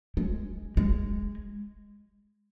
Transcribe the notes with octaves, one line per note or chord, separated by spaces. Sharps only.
G#3
G#3